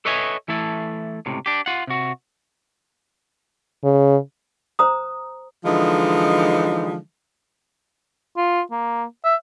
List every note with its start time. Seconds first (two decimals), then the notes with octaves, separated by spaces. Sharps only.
0.05 A4 B4 C#5 D#5 E5 G#5
0.48 E3 A3 E4 A4
1.26 C#2 A2 C3
1.46 D4 G4
1.66 F4 F#5
1.87 C3 F#4
3.84 C#3
4.79 C5 A#5 D#6
5.65 D3 E3 F3 G#3 D#4
8.37 F4
8.71 A#3
9.25 E5